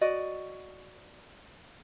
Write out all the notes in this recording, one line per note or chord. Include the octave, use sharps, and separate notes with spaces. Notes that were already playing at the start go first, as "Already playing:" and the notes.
F#4 D5 D#5